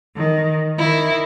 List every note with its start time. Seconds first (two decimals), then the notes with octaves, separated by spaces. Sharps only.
0.15 D#3
0.77 D#3 E4